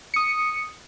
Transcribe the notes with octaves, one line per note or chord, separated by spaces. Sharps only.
D#6 C#7